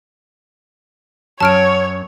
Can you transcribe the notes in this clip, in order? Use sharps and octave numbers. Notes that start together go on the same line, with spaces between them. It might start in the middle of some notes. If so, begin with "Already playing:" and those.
F#2 F#3 C#5 A5 F6 D7